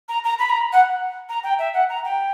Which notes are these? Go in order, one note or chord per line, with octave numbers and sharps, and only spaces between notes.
A#5
A#5
B5
A#5
F#5
A#5
G5
E5
F#5
A#5
G5